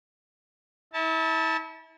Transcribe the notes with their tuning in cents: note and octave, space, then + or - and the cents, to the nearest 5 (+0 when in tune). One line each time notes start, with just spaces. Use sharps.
E4 -35 A5 +0